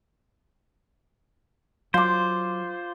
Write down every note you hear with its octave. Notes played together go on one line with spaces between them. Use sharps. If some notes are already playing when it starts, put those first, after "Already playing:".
F#3 F4 C5 D6